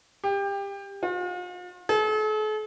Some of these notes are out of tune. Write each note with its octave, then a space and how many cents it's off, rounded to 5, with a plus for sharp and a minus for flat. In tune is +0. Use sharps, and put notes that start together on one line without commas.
G4 +25
F4 +45
A4 -45